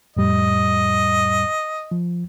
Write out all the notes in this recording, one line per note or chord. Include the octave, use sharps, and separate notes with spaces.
F2 A2 G3 D#5
F3